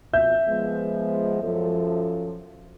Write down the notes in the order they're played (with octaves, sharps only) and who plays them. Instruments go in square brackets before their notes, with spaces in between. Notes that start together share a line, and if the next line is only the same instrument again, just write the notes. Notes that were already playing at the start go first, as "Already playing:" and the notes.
[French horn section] F2 B2 [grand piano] E5 G6
[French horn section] F3 G#3 B3
F#2 F3 A4